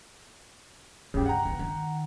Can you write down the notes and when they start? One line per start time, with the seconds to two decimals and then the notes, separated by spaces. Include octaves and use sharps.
1.14 D2 G2 C#3 G4
1.26 F#5 G5 A#5
1.45 E2
1.59 D#3